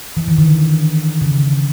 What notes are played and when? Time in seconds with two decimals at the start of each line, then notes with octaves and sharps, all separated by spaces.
0.17 E3
0.28 D#3
0.38 D3
1.21 C#3